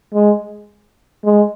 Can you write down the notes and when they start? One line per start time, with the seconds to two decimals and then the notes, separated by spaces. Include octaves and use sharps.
0.14 G#3
1.24 G#3